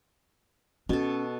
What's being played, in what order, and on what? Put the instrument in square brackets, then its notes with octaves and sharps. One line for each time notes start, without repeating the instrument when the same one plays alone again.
[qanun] B2 A4 [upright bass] C#4